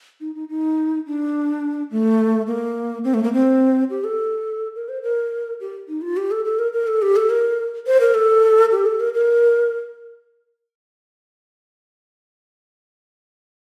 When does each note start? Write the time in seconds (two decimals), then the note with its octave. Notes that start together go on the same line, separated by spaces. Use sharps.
0.21 D#4
0.35 D#4
0.49 D#4
1.06 D4
1.91 A3
2.47 A#3
3.04 C4
3.14 A3
3.23 A#3
3.33 C4
3.90 G4
4.04 A4
4.75 A#4
4.89 C5
5.02 A#4
5.60 G4
5.89 D#4
6.02 F4
6.17 G4
6.31 A4
6.45 A4
6.59 A#4
6.73 A#4
6.87 A4
7.02 G4
7.16 A4
7.30 A#4
7.87 C5
8.01 A#4
8.14 A4
8.72 G4
8.86 A4
9.00 A#4
9.14 A#4